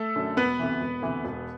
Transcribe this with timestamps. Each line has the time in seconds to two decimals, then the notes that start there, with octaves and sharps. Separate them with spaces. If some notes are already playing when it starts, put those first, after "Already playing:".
Already playing: A3 A4
0.15 F#2 D3 F#3
0.37 E1 B3 B4
0.59 D2 C3 E3
0.80 E1
1.02 D2 C3 E3
1.25 E1